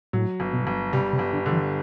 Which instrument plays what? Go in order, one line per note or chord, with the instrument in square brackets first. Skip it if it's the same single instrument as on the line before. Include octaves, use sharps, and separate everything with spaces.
[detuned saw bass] A2 [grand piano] F#3
[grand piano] G1
[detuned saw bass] B2
[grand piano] G1
[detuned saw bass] C3 [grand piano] G3
[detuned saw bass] C3
[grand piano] G1
[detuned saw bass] D3
[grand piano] D3
[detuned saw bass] E3